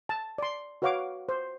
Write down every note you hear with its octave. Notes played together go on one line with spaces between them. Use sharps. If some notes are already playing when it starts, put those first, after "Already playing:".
A5
D5 C6
F#4 B4 C#5 F5 F#5 D6
C5